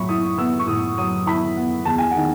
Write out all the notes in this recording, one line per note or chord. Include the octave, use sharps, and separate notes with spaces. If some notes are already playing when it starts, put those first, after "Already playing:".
Already playing: A2 F#3 E5 B5 C#6
E4 D#6
B3 E6
C#6
A2 D#6
F#3 D#6
E4 B5
B3
E2 A5
G#5
D#3 F#5